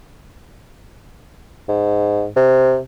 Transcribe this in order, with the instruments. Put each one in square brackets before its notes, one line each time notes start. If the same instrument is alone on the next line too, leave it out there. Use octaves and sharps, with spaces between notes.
[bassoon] G#2
C3